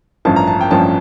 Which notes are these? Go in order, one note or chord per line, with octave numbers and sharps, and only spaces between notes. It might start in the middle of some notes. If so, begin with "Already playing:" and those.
A1 G2 F3 C#4 A5
A#5
A5
G5
A1 G2 F3 C#4 A5